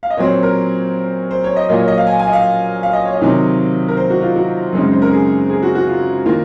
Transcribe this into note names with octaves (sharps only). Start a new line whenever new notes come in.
F5
D#5
A#2 F#3 C4 C#5
C5
A#4
C5
C#5
D#5
A#2 F#3 A#3 F4 D#5
C#5
D#5
F5
G#5
G#5
D#5
F5
F5
D#5
C#5
D#5
C3 D#3 F#3 C4 D#4
A#4
C5
F#4
F4
F#4
F#2 C#3 G#3 C4 D#4
C5
A#4
G#4
G#4
F#4
F#4
F4
D#3 A#3 F4